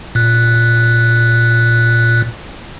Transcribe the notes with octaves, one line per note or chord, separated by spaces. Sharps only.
A#2 F#6